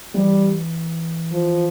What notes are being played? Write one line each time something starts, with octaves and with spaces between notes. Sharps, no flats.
E3 G3
F3